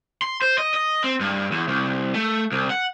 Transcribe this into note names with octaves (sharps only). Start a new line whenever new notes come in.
C6
C5
D#5
D#5
C4
G2
E2
C2
A3
C2
F#5